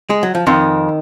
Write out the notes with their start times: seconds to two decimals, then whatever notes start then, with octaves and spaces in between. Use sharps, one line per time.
0.10 G#3
0.23 F#3
0.35 F3
0.47 F2 D#3